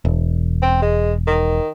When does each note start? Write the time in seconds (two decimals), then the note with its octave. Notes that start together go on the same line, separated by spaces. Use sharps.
0.05 E1
0.62 C4
0.82 G#3
1.27 D#3